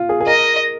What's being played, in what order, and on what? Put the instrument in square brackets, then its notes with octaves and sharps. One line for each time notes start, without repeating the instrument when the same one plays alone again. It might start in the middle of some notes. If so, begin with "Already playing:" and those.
Already playing: [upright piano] F4
G#4
G#4
[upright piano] A#4 [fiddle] D#5